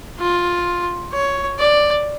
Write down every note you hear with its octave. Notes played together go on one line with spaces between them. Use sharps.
F4
C#5
D5